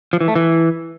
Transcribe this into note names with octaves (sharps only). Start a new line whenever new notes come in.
F3
E3
A3
E3